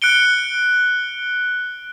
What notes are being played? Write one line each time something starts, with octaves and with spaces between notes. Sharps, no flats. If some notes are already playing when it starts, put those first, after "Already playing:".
F#6 C#7 D7 G7